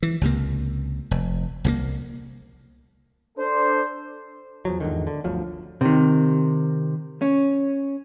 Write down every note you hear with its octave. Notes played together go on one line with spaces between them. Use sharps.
E3
C#2 C3 A#3
F1
C2 F3 A#3
D4 A4 C5
E2 F3 F#3
E2 G#2 D3 D#3
D3
G1 D2 F3 F#3
C3 D#3
C#4